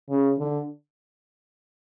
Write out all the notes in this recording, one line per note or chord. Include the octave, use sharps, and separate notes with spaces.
C#3
D3